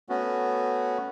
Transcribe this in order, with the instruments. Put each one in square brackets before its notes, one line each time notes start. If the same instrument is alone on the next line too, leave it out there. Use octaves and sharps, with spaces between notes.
[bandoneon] A3 B3 C#4 F#4